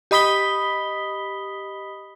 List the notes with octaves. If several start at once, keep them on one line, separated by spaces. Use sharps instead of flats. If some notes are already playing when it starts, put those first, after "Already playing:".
G4 D#5 B5 D#6 B6 G7